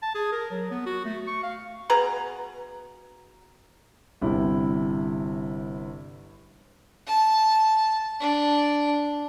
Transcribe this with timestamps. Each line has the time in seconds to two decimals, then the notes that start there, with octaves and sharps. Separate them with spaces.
0.03 A5
0.15 G#4
0.32 A#4
0.51 F#3
0.71 B3
0.86 F#4
1.05 A3
1.27 C#6
1.43 F5
1.90 B2 G#4 B4 A#5
4.22 G1 C3 E4
7.07 A5
8.20 D4